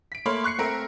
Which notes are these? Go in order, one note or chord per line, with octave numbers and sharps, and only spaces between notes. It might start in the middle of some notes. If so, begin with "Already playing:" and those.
B6 D7
A3 A#3 C#5 B5 C6 F6
C#6 F#6 C7 C#7
A3 C4 A#4 E5 D7